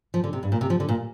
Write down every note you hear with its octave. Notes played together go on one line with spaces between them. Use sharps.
F3
D3
C3
G2
A#2
C3
F3
D3
A#2